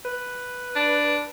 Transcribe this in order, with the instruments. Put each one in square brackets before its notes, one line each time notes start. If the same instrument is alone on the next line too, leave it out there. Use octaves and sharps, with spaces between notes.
[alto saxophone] B4
[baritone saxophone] D4